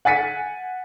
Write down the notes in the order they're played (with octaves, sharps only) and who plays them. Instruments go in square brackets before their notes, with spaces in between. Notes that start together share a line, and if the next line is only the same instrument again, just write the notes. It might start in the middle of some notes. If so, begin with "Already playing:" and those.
[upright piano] F#5 G#5 A6 B6 C#7 D#7